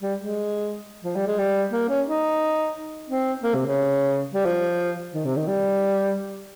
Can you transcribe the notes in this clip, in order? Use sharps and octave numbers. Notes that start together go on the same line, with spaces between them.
G3
G#3
F3
G3
G#3
G3
A#3
C#4
D#4
C4
A#3
C3
C#3
G3
F3
D#3
C3
D#3
G3